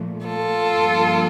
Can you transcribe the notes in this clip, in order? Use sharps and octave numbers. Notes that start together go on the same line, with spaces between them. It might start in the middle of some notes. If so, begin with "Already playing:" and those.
Already playing: A#2 F3 A3
F4 A4
G2 F3 A#3